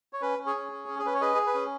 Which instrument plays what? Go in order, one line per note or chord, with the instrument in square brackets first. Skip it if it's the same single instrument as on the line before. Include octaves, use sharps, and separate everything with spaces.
[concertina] C#5
C#4 B4
C#4
G#4 C#5
C#4
C#4
C#4
G#4
C#4 B4
C#5
G#4 B4 D#5
G#4
B4
C#4